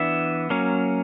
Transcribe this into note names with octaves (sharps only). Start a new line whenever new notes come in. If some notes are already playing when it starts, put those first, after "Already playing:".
Already playing: E3 B3 D4 E5
F#3 A#3 C#4